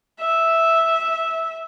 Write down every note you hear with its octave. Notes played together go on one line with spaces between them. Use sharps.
E5